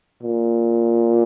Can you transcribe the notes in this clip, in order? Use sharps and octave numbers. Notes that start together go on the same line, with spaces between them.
A#2